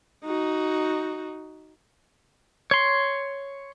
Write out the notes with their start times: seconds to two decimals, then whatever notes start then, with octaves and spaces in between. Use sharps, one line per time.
0.25 D#4 F#4
2.71 C#5 C6